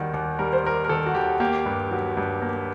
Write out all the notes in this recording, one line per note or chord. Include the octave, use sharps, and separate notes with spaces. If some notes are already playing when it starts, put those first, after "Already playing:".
Already playing: D#2 D#3 G3 F#4
D#2
G3 A#4
C5
D#2 A#4
A#4
D#3 A4
F#4
D#2 G4
A#3 G4
G2
F#3
G2
A#3